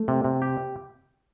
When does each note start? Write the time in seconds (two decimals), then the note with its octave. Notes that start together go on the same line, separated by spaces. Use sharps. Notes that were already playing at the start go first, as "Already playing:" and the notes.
Already playing: A3
0.08 C3
0.24 C3
0.42 G4